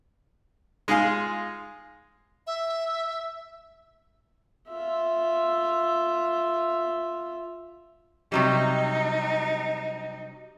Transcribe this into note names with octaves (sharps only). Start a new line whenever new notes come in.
G#3 D#4 F4 G#4 F5 G#5
E5
F4 E5
C3 F#3 G3 D#4